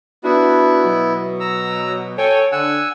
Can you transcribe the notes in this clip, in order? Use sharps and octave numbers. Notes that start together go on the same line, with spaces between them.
B3 D4 E4 F#4
B2 F#3
A#5 E6
A4 C#5 G5 G#5
D3 D4 F#5 G#5 E6